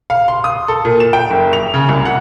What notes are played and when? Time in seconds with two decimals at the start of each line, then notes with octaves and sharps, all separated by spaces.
0.10 F5
0.28 C6
0.44 D#6
0.68 A4
0.85 A#2
1.00 E7
1.13 G5
1.30 F#1
1.53 F7
1.74 C#3
1.89 C2
2.05 F#5